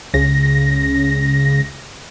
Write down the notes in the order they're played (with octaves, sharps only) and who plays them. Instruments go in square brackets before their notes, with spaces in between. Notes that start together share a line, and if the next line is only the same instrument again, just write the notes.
[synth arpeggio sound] C#2 C#3 A#6